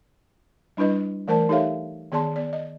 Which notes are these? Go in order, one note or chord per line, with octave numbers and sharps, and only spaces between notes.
G3 D4 E4 B4 D#5
E3 A3 A#4 C5 D5 A5
D#4 G4 A4 C#5 E5 F5
D#3 B3 G#4 D5 A5 C6
B3 D5
D#5